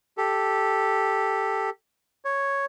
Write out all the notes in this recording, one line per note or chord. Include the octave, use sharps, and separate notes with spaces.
G4 A4
C#5